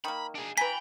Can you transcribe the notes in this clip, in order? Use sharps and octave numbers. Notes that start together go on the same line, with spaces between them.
D#3 A#3 B5
D4 G#4
B4 G5 G#5 A#5 B5 B6